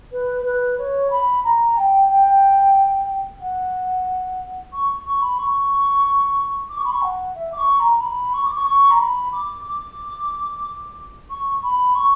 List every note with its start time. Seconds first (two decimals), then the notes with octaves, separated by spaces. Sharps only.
0.11 B4
0.44 B4
0.78 C#5
1.10 B5
1.43 A#5
1.76 G5
2.09 G5
3.40 F#5
4.72 C#6
5.04 C#6
5.20 B5
5.38 C#6
6.69 D6
6.77 C#6
6.84 B5
6.91 C#6
7.01 F#5
7.34 E5
7.52 D6
7.57 C#6
7.79 A#5
8.00 B5
8.33 C#6
8.44 D6
8.54 C#6
8.65 C#6
8.90 A#5
8.98 B5
9.32 D6
9.64 D6
11.29 C#6
11.62 B5
11.94 C#6